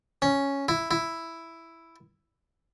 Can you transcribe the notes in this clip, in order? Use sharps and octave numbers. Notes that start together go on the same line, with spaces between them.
C#4
E4
E4